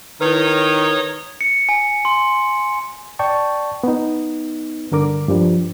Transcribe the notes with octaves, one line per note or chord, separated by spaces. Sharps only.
D#3 D#4 E4 B4 C#5 D#6
C#7
G#5
C6
D5 G5 A5 C#6
B3 D#4
G2 D3 A#4 D6
G2 F3 G3